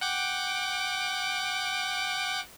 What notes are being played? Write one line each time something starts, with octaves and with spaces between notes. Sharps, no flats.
F#5 G5 D6